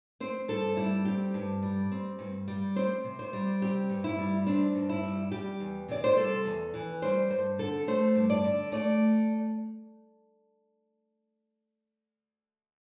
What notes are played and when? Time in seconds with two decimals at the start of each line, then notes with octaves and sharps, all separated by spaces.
0.20 C4 C5
0.48 G2 A4
0.77 G3 E4
1.05 C4 G4
1.34 G2
1.63 G3
1.92 C4
2.19 G2
2.48 G3
2.76 C4 C5
3.04 C3
3.19 C5
3.33 G3
3.62 C4 G4
3.89 G2
4.04 E4
4.18 G3
4.47 C4 D4
4.75 G2
4.89 E4
5.03 G3
5.32 G3 G4
5.60 E2
5.88 C3 D5
6.04 C5
6.17 G3 A4
6.45 E2
6.74 E3
7.02 G3 C5
7.30 G2 C5
7.59 D3 A4
7.87 A3 C5
8.16 G2
8.30 D5
8.44 D3
8.72 A3 D5